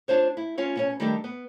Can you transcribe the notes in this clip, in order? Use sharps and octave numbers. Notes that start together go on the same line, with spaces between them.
D4 F4 C5 C#5
E4
C#4 F4 C#5
B2 C#4 C#5
D#3 G3 A3 D4 G4
B3